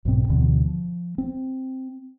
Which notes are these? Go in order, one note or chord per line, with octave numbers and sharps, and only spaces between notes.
B1 G#2 B2 C4
D2 B2 D3 E3
F3
C4